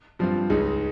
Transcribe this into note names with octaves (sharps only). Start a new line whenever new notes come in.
G2 F3 C4 F4
C#2 C#3 G#3 D#4